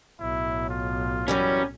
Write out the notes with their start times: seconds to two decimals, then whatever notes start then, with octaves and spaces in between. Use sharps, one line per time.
0.21 B1 A2 E4
0.70 F4
1.28 F#2 E3 F#3 G3 C#4